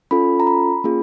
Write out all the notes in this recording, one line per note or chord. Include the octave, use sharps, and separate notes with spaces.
C#4 F4 A4 B5
A#5
B5
A#3 C#4 F4 G#4